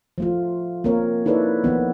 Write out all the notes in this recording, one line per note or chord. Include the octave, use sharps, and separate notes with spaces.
F3 A3 F4
A#3 C4 A#4 C#5
D#4 E4 A4 B4 C#5 D5
E3 F3 B3